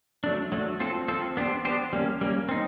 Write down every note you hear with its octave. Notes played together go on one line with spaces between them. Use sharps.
F#3 A3 D4
F#3 A3 D4
C4 F4 A4
C4 F4 A4
B3 D4 G4 C5
B3 D4 G4 C5
G3 A#3 C#4
G3 A#3 C#4
C4 D#4